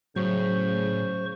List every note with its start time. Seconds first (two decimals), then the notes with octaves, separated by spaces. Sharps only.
0.16 A2 C#3 F#3 C5 C#6